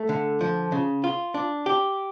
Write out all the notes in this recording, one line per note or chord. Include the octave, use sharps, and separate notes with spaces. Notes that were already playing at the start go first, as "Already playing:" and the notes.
Already playing: A3
D3
F3
C#3
F4
D4
G4